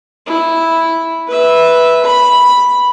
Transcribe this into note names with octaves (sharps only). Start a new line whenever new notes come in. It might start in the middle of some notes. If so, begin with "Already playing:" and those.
E4
B4 E5
B5